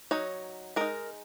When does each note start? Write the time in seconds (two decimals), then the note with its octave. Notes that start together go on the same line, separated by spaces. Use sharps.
0.11 F#3 D#4 C#5
0.76 G#3 D#4 A#4